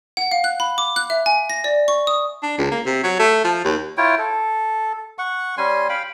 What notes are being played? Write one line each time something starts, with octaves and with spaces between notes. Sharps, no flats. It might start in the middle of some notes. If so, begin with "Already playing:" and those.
F#5
F5
F#6
B5
D6
F#6
E5
G#5
A#6
D5
C#6
D#6
D4
C#2
A#3
C3
F#3
A3
F3
D#2
E4 F4 C#5 G5
A4
F#5 C#6
G3 C#4 G#5 C6
F5 G5 B5